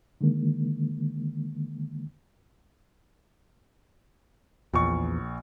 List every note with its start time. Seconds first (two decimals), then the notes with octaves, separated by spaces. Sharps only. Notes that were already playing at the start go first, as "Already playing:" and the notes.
0.21 D3 D#3 G#3 A#3
4.74 A#1 E2 C#6